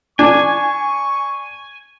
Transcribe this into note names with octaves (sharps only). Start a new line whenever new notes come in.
D4 G#5 C#6